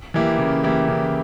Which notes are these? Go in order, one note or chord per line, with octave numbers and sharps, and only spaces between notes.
E3 A#3 E4 G4
C#3
E3 A#3 E4 G4
C#3